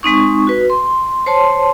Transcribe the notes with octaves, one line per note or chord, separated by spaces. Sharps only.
G#3 C4 D#4 C#6
F#4 B4
C6
C5 C#5 A5 C6